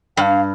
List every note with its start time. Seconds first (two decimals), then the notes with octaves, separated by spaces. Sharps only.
0.17 G2 F5 G5